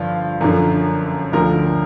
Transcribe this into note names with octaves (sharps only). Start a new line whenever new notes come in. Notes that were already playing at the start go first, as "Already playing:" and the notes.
Already playing: G2 D3 F3 F4
F#2 D3 F3
D2 D3 F3 A#4